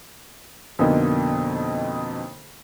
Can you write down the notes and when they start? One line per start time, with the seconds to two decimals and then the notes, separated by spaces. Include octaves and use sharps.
0.79 F2 B2 D3 A#3 D#4